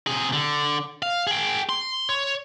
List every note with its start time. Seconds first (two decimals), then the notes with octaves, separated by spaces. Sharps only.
0.07 C3 G#4
0.33 D3
1.03 F5
1.27 G#4 G5
1.69 C6
2.09 C#5